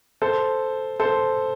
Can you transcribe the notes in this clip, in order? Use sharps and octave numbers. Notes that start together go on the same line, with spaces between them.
A4 C5
A4 C5